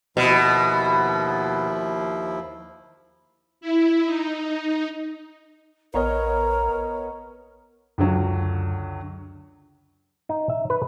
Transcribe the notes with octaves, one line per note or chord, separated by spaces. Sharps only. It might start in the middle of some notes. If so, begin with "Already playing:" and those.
D#2 B2 F3 E4
E4
D#4
A#1 B3 A#4 C#5 D#5 A#5
C#2 F#2 D3 F#3
D#4
E5
B4